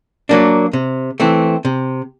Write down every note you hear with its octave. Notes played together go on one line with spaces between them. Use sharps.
F#3 A#3 D4
C3
E3 A3 C4
C3